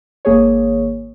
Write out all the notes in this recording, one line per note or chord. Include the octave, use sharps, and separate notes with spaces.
G#1 A#3 G#4 C#5